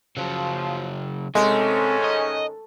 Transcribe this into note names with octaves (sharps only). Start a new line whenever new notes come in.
C#3 F3 F#3
G#2 C3 D#3 G#3 A3 C#4
D#5